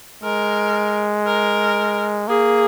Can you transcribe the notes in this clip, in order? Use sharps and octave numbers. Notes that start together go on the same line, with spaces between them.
G#3 A#4
A#4
A#3 G#4